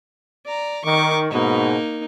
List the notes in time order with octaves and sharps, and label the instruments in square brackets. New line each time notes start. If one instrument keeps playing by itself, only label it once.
[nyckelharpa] D5 A#5
[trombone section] D#3 [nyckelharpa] C#6 D6
[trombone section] G#2 B2 [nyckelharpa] A#3 D#4